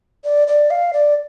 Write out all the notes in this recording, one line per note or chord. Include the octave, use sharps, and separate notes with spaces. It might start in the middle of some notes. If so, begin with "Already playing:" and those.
D5
D5
F5
D5